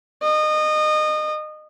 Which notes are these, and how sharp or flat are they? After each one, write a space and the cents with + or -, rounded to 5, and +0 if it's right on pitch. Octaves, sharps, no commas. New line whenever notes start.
D#5 -25